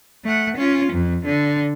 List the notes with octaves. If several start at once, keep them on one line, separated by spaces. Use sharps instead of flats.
A3 F#5
C#4 F4
F2
D3